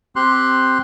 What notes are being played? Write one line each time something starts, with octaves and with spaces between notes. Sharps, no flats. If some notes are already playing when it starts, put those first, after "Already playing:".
C4 G4 C6 F#6